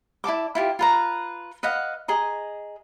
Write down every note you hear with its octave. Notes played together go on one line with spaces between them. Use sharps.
E4 D5 A5 D6
E4 F4 G4
F4 B4 A#5
B4 D#5 F5 F#5
G#4 D#5 A#5